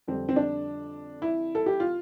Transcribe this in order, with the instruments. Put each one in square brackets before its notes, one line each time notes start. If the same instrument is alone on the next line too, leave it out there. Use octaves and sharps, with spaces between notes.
[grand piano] F2 D3 G3 C4
C4
D4
E4
A4
G4
F4